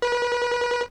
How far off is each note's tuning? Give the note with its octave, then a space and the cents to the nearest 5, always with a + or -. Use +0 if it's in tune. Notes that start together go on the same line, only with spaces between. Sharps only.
B4 -35